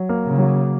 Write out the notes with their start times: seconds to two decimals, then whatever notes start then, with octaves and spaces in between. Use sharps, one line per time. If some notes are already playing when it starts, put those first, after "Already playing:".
Already playing: F#3
0.09 A#3
0.24 C#3
0.38 F#3